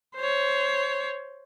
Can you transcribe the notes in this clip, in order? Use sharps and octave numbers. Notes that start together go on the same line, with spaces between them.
C5 C#5